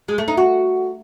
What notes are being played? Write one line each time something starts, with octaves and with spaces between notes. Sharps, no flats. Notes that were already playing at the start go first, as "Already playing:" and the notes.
G#3
A3
D#4
F#4